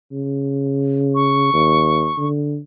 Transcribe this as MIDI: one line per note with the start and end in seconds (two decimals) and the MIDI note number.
0.11 1.49 49
1.15 2.27 85
1.53 2.10 39
2.17 2.58 50